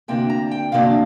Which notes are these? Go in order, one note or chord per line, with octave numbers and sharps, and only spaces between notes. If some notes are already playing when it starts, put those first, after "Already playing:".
D2 C3 A#3 D4 G5
A#5
G5
D2 C3 A#3 D4 F5